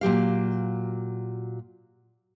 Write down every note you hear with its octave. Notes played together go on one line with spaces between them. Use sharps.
A#2 F#3 G4 F5